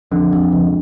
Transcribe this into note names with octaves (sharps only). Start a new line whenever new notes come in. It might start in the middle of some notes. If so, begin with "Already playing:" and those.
F2 D3
F2
C#2